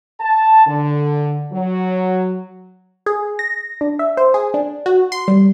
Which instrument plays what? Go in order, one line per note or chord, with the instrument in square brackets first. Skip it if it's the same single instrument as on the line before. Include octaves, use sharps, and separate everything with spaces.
[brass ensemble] A5
D3
F#3
[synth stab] G#4
A#6
D4
E5
C5
G#4
D4
F#4
C6
G3